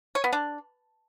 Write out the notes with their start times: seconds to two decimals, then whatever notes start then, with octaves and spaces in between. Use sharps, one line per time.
0.15 C#5
0.24 B3
0.33 D4